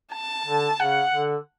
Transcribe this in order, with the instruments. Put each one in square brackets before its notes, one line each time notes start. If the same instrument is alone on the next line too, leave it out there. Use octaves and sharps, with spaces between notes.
[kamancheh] A5
[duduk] D3
[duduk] C#3 [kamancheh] F#5
[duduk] D3